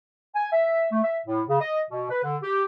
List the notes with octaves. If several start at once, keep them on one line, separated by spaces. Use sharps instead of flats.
G#5
E5
A3
E5
A2
C#3
D#5
B2
B4
D3
G4